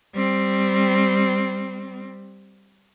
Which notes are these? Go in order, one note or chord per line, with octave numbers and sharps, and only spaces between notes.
G3 C4